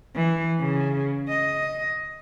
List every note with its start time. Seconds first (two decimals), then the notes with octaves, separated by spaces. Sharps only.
0.16 E3
0.61 C#3
1.28 D#5